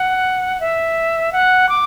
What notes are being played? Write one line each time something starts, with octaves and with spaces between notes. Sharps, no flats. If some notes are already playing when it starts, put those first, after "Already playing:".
Already playing: F#5
E5
F#5
D6